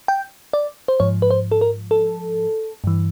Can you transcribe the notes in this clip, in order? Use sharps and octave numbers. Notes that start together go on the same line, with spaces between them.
G5
D5
C5
G#2 F3 C#5
B4
C5
A4
A#4
A4
G2 E3